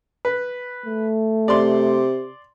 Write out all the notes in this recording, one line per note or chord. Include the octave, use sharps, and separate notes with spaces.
B4
A3
C3 D5 C6